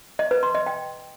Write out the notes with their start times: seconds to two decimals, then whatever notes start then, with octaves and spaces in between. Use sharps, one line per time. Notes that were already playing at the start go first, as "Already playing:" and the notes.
0.19 D#5
0.31 B4
0.43 C6
0.55 D#5
0.66 G5